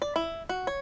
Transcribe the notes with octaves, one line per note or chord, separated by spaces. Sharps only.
D5
E4
F#4
C#5